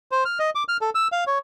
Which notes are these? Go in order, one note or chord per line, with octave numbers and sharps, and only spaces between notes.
C5
F6
D#5
D6
F6
A4
E6
F5
C#5